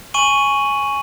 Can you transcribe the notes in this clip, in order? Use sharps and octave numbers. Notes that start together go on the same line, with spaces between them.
G#5 C#6 D#7 F#7